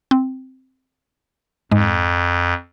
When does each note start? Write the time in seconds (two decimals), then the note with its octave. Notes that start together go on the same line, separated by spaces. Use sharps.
0.11 C4
1.72 F2 G#2 G#3